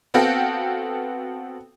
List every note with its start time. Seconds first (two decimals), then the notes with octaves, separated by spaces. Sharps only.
0.14 B3 C4 F#4 A4 F5 G5